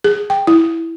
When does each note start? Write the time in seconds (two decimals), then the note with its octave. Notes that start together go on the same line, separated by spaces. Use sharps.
0.04 G#4
0.30 G5
0.47 E4